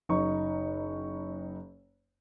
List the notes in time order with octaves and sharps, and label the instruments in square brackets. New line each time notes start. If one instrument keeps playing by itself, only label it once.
[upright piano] F#1 D#4 C#6